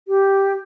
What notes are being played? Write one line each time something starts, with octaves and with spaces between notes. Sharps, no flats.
G4